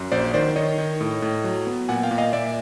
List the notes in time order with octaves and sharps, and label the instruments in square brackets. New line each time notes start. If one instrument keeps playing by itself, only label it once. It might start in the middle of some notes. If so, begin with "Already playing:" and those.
Already playing: [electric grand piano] F#2
A#1 C5 D5
D#3 C5 D5
D#3 C#5 D#5
D#3
A2
A2
F#3
B3
A#2 F#5 G#5
F5 G5
A#2
D#5 F5
A#2 D5 E5